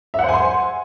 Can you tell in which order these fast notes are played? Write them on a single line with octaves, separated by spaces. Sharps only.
E5 F#5 C5 G#5 C6